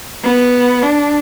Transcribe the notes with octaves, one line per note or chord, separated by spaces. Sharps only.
B3
D4